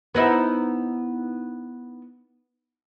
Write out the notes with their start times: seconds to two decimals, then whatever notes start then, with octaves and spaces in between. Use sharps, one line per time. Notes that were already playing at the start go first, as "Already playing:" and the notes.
0.15 B3 D#4 E4